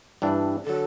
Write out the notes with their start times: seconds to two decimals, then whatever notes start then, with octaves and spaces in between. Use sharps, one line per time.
0.22 G2 E3 G3 D4
0.65 D3 F#3 A4